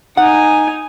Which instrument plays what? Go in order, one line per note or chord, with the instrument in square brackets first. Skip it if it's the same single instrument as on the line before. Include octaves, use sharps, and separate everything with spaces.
[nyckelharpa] D#4 G#5 [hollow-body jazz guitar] F#5